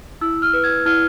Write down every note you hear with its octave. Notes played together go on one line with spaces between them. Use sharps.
E4 E6
F6
B4
G#6
E4 F6